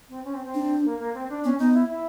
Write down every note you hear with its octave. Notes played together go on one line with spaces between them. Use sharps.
C4
C#4
C4
C4
D4
A#3
A#3
C4
D4
B3 C#4
B3 D#4
E4
E4